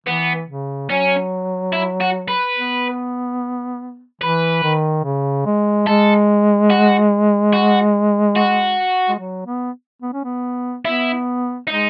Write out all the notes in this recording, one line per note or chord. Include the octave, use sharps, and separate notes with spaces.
E3 B3
C#3
F#3 C#4
E4
F#4
B4
B3
E3 B4
D#3
C#3
G#3
G#3 A4
F#4
F#4
F#4
G#3
F#3
B3
B3
C#4
B3
B3 E4
G#3 D#4